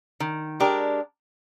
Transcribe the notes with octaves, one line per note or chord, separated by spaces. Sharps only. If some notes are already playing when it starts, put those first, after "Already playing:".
D#3
G#3 D4 G4 A#4